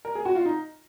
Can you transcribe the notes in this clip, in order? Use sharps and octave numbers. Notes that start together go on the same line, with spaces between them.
A#4
G#4
F#4
F4
D#4